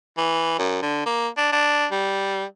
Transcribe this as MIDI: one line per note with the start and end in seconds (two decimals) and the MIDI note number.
0.17 0.58 52
0.58 0.80 42
0.82 1.05 50
1.06 1.28 58
1.37 1.48 62
1.52 1.86 62
1.91 2.45 55